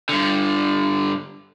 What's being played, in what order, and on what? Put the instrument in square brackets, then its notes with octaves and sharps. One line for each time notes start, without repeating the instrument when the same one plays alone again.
[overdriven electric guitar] G2 D3